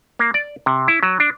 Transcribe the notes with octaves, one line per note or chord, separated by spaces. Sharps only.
A#3
D5
C3
E4
F#3
D4